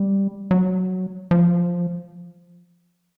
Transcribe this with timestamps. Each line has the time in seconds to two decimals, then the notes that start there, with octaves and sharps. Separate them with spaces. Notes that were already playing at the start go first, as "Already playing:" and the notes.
Already playing: G3
0.51 F#3
1.31 F3